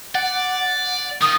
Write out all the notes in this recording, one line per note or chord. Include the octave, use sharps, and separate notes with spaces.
D5 F#5
D#3 F4 D#6